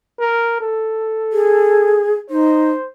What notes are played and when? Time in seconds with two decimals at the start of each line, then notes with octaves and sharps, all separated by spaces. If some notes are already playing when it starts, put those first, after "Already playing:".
0.20 A#4
0.61 A4
1.33 G#4
2.30 D#4 C5